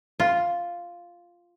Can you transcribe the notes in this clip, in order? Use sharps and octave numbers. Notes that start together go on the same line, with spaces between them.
F4